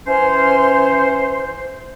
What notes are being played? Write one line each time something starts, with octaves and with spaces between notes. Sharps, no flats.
E3 C#4 C5